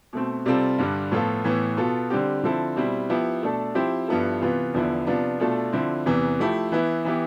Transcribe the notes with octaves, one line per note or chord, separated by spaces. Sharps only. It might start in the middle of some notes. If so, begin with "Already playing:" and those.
B2 A3 C4
C3 G3 C4 F4 A4
G2 D3 G3 D4
A2 F3 B3 F4 A4
A2 E3 B3
B2 B3 F4 A4
D3 G3 C4 G4
D3 F3 C4 E4 A4
B2 G3 C4 E4
F3 B3 E4 G4
B2 A3 D4 A4
F3 C4 E4 G4
G2 F3 B3 E4 A4
C3 E3 B3 F4
E2 D3 F3 B3 E4
C3 F3 B3 D4 F4
B2 A3 D4 F4 A4
D3 F3 C4 E4
E2 C3 E3 B3
F3 A3 E4 G4
E3 B3 E4
E3 B3 E4 G4